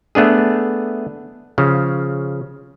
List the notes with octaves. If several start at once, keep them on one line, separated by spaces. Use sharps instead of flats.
A3 B3 D4 G#4
C#3 F3